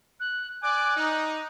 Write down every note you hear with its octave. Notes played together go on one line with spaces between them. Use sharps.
F#6
D5 G#5 D6 F#6
D#4